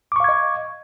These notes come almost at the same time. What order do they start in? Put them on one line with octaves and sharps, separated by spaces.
D6 C#6 F5 G#6 D#5